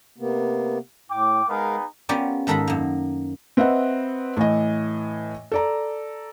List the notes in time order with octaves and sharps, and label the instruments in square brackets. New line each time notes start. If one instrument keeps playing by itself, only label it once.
[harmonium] C3 A#3 B3
[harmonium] A2 [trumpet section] G5 D6
[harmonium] G#3 A#4 F5 [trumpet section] B3 D#4 G#4
[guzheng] B3 C#4 F4 G4 A#4 D5
G#2 D#3 A4 A#4 A5 B5
F#2 A#3
[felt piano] C4 B4 D#5 E5 F#5
A2 E3 D#5
A4 D5 A#5